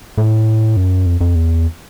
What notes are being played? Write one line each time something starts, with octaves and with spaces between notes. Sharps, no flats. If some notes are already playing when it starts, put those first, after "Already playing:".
A2
F#2
F2
F2
E2